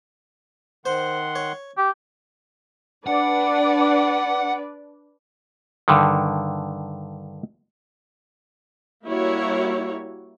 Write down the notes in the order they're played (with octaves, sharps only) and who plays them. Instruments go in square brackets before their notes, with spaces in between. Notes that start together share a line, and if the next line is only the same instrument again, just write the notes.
[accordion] D#3 F#5 C6 [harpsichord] C5
[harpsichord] C#5
[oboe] G4
[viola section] D4 B4 D5 [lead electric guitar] F#5
[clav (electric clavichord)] G2 D3 D#3
[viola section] G3 A#3 E4 F#4 C#5